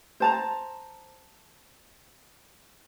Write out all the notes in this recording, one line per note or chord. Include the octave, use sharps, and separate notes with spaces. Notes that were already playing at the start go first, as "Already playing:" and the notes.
C5 A5 A#5